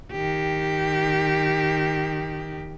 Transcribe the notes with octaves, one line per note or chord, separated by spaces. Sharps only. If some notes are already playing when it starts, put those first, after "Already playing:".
D#3 G4